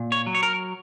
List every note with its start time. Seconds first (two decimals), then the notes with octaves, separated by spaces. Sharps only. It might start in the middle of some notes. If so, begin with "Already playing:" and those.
Already playing: A#2
0.12 C#5
0.27 F#3
0.35 C#5
0.43 A#4